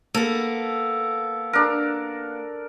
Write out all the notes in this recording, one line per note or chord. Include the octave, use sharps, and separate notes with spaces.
A#3 B3 A4
D4 A#4